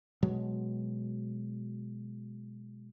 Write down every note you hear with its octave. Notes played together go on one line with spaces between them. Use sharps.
B2 F#3 G#3